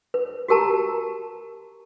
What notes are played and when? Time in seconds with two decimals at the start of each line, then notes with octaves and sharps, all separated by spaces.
0.14 B4
0.48 F#4 G4 A#4 A5 A#5